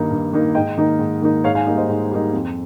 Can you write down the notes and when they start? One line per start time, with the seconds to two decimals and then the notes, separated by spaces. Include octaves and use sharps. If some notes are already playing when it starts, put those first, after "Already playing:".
Already playing: G2 D#3 A#3 D#4
0.11 G2
0.33 D#3 A#3 D#4
0.55 G#2 D#5 G5
0.78 D#3 A#3 D#4
0.99 G#2
1.22 D#3 A#3 D#4
1.44 G#2 C#5 F5
1.55 F5 G#5
1.67 G3 A#3 D#4
1.78 C5 D#5
1.89 G#2
2.11 G3 A#3 D#4
2.33 F2